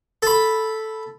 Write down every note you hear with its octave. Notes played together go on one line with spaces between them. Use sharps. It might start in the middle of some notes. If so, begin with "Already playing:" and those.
A4 B5